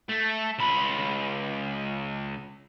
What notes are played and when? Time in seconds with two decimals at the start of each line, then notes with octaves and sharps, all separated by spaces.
0.09 A3
0.59 C#2 B5